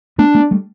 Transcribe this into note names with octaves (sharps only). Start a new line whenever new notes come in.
A3 B3 D4
A3 B3
G3 A3